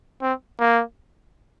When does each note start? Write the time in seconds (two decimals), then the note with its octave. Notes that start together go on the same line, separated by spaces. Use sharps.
0.22 C4
0.60 A#3